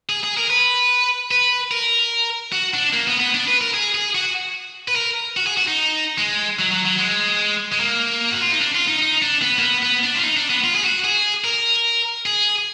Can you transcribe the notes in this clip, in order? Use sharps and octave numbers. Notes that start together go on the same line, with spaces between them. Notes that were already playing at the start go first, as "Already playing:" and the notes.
G#4
G#4
A#4
B4
B4
A#4
F#4
D4
A#3
B3
B3
D4
B4
A#4
G#4
G#4
F#4
B4
A#4
F#4
G#4
F#4
D#4
G#3
F#3
F#3
F#3
G#3
G#3
A#3
F#4
F4
D#4
D4
F4
D#4
D#4
D4
B3
A#3
B3
B3
D4
F4
D#4
D4
B3
F4
G#4
F#4
G#4
A#4
G#4